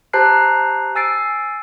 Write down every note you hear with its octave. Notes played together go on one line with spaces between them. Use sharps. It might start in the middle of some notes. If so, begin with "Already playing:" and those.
G4 C5 A5 A#5 F#6 C7
G#5 E6 A6 C7 D7